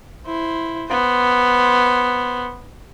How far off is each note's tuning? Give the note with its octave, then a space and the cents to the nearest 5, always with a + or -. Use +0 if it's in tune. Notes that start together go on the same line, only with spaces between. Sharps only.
E4 +0 C5 +0
B3 +0 C5 +0